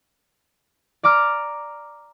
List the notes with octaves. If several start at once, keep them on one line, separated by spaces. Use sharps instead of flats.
D5 A#5 D6 F6